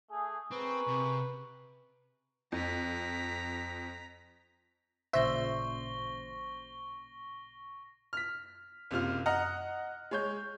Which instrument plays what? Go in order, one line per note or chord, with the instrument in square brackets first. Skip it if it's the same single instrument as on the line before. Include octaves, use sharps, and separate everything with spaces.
[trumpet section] A3 G#4
[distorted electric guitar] C4 [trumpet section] G#4 A#4 C#6 [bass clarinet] B4
[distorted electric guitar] C3
[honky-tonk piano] F2 [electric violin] A#5 B6
[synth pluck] A1 A#2 C#3 [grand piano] C5 [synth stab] E5 [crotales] C#6 A#6 G7
[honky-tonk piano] F6 B6
F#1 C3 F4 F6
D#5 F#5 A#5 F6 F#6
G#3 C#5 G6